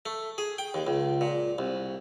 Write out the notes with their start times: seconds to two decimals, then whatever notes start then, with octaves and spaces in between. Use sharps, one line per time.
0.06 A3
0.38 G#4
0.58 G5
0.74 D#2
0.87 C#2
1.21 A#2
1.58 C2